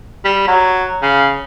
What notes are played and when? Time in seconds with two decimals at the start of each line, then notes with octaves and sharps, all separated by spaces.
0.25 G3
0.47 F#3
1.02 C#3